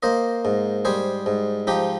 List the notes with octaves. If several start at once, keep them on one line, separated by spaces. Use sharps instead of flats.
A#3 C5 D#5
G#2
G3 G#4 C5
G#2
F3 D#4 G4